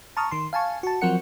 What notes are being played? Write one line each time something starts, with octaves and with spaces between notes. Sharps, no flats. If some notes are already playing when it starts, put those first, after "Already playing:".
A5 A#5 C#6 D#6 F6
D#3 C6
F5 G#5 A5 C#6
F#4 A5
F3 F#3 C4 A#4 F#5 C#7